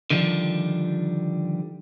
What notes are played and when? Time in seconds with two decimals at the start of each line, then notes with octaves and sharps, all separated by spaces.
0.10 D3 D#3 F3 G3